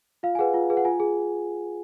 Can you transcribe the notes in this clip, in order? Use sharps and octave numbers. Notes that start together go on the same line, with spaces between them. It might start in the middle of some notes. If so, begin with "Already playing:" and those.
F4 F5
G#5
G#4 B4 F#5
F4
G#4 B4
F#5
F4 G#5
G#4